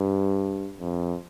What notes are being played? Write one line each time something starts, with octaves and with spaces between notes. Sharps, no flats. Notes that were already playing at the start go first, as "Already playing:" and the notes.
Already playing: G2
F2